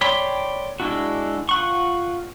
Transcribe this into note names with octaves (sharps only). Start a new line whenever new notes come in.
C#5 D5 G5 B5 C6
G#3 D4 E4 F#4
F4 F#5 C#6